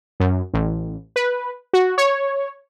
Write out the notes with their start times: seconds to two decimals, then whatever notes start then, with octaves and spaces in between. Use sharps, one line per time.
0.20 F#2
0.54 A1
1.16 B4
1.73 F#4
1.98 C#5